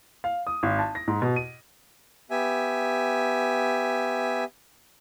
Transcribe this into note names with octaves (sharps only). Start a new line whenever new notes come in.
F5
D#6
G#1
A5
A#6
G#2
B2
D#7
B3 G4 E5 G#5